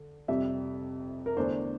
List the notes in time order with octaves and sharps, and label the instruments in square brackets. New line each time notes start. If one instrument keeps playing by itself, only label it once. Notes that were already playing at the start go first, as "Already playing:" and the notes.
Already playing: [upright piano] D3
F2 C3 G3 E5
A#4
E2 D3 A3 D4 C5